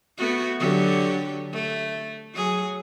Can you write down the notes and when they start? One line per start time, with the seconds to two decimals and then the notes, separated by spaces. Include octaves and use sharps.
0.18 A3 B3 F#4
0.60 D3 F#3 G4
1.52 A3
2.34 F#3 G#4